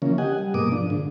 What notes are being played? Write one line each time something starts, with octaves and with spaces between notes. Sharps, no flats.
C#3 E3 F3 A#3 C#4
G4 D#5 F#5 G#5
G3
G#2 B2 A#3 D6 D#6
F3 D4
G#2 D3